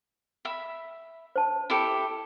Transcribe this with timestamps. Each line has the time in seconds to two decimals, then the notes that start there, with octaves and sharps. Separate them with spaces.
0.45 E5 B5
1.36 C5 A5
1.70 E4 G4 A4